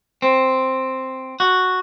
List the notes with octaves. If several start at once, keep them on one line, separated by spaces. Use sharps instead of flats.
C4
F#4